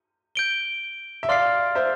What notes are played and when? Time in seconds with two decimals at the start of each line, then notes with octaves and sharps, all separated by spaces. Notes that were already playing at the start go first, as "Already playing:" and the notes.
0.35 G6 D7 G7
1.23 E5
1.29 D5 F5 C6 F6 A6 C7
1.75 C5 E5